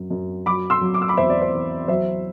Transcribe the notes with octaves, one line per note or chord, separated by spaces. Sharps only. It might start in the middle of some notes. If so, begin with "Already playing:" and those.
Already playing: F#2 F#3
F#2
F#3 B5 D6
C6 E6
F#3
D6
E6
B5 D6
E2 C5 E5
D5
C5
E2
F#3 C5 E5